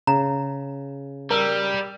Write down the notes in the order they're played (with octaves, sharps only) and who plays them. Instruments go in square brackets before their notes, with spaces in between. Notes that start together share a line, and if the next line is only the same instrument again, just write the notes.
[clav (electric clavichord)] C#3 [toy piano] A#5
[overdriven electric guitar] G3 [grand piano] A#4 E6